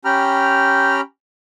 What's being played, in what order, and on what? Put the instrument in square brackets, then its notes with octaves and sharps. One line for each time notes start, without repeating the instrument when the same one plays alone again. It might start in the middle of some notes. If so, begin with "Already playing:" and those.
[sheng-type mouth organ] C#4 G4 G5 A#5 B5 F6